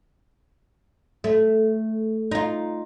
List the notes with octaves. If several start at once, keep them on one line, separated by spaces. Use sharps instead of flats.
A3
D#4 F4